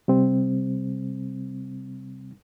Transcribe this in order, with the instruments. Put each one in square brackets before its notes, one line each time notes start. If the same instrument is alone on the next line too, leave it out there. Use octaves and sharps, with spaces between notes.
[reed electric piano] C3 G3 C4